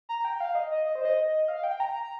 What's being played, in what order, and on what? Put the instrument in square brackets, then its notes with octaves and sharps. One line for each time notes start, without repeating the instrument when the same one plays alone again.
[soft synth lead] A#5
G5
F5
D#5
D#5
D#5
C5
D#5
F5
G5
A#5